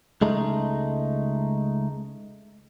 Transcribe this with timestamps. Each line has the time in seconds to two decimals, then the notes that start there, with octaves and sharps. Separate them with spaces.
0.21 C#2 G#3 A3 D#4